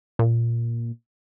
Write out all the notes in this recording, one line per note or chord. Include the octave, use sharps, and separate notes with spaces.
A#2